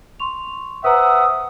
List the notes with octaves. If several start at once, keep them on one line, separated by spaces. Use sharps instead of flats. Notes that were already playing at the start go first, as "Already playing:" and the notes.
C6 C#6 F7
B4 C5 E5 F#5 A#5 D#6